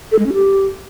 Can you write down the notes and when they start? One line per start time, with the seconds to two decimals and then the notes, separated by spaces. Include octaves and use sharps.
0.12 A4
0.19 G#3
0.26 C#4
0.33 G4